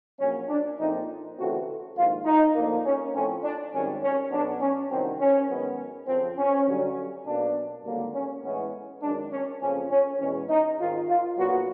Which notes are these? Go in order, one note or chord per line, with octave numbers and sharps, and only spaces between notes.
A#1 A#2 F#3 C#4
D4
A#1 A#2 F3 A3 C4 D#4
D2 C#3 E3 A3 C4 F#4
A#1 G#2 D#3 F4
D#4
D2 D3 F3 A#3
C#4
A2 F3 A3 C4 C#4
D4
G#1 F#2 D#3 G3 C4 C#4
C#4
B1 B2 F#3 B3 D4
C#4
C2 C3 D#3 F#3 C4
C#4
G#2 D#3 F#3 B3
F2 C#3 F3 C4
C#4
G2 D3 F#3
B1 B2 F#3 A#3 D4
G#1 G2 D3 F#3 A#3
C#4
A2 E3 G#3 B3 C#4
F#2 D#3 G#3 D4
C#4
F2 C#3 F3 A#3 C#4
C#4
E2 B2 G#3 C#4
D#4
G#1 G#2 D#3 F4
F4
B1 A#2 F#3 B3 F#4